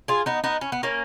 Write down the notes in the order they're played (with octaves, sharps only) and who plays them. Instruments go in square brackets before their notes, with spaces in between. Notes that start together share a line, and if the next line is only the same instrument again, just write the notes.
[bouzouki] F4 G#4
B3 D#4
B3 D#4
C#4
B3
A#3 C#4